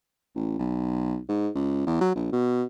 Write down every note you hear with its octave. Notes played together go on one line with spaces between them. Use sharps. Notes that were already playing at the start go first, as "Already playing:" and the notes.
A1
B1
G#2
C#2
E2
F#3
A#1
B2